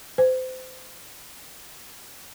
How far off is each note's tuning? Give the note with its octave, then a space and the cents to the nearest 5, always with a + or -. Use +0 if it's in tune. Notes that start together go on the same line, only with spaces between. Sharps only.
C5 -30